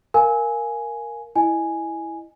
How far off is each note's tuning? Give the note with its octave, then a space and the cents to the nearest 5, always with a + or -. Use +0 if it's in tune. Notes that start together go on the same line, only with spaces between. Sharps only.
A#4 +0 F5 +0 G#5 +5
E4 +0 D#5 -15 G#5 +0